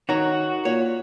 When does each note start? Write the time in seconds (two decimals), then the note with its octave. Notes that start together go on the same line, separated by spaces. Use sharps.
0.09 D#3 F#4 C#5 A#5
0.65 A#2 C#5